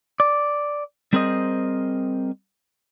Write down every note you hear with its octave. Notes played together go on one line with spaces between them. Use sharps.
D5
G3 C4 G#4 A#4 C5 D#5